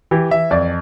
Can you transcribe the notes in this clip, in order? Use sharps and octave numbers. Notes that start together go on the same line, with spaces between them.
E3 G4
E3 E5
F2 D5